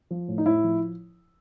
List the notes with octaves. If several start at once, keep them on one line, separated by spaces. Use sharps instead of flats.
F3
A2
D#4
A2 E4
F3